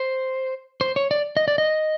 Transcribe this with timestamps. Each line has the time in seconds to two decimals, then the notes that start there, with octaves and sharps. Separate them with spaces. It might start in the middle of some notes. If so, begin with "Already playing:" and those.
Already playing: C5
0.81 C5
0.96 C#5
1.11 D5
1.37 D#5
1.48 D5
1.58 D#5